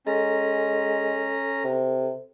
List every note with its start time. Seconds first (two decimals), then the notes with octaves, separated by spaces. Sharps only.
0.07 G#3 C#4 A4 A#5
1.64 C3